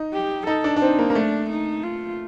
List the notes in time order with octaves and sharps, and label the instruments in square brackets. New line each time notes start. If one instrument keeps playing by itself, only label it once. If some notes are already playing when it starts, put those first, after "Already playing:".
Already playing: [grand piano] D#4
[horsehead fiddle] G4
[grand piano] D#4 [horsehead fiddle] A4
[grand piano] D4
D4
[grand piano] C4 [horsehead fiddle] D#4
[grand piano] A#3
A#3
[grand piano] A3 [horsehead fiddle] D4
[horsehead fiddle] D#4
F4